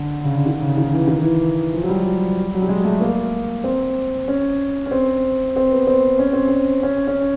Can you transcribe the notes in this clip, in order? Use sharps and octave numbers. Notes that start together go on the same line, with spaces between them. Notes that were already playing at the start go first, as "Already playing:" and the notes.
Already playing: D3
C#3
D3
D#3
C#3
D#3
E3
D#3
E3
F3
F#3
G3
F#3
G3
G#3
A3
A#3
C4
C#4
C#4
C4
C4
B3
C4
C#4
C4
C#4
C#4
C#4